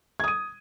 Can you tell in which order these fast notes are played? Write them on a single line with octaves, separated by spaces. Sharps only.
G#6 D#6 D#7